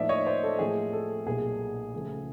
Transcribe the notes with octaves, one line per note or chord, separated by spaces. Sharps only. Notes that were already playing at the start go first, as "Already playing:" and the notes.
Already playing: A2 F3 A#3 D#4 D5 E5
C#5 D#5
C5 D5
A4
A2 F3 A#3 G#4
A4
B1 A#2 G3 A#3 G#4
C#2 C#3 F3 A3